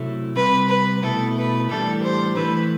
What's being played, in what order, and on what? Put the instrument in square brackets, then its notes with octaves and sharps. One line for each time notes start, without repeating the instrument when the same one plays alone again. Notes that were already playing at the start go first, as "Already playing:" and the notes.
Already playing: [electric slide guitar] C3 F#3 A3 E4 A4
[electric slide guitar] C3 G3 C4 [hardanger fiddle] B4
[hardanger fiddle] B4
[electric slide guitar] B2 A3 E4 [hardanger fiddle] A4
[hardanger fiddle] B4
[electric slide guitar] A2 E3 G3 D4 G4 [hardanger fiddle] A4
[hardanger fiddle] C5
[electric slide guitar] E3 A3 E4 A4 C5 [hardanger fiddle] B4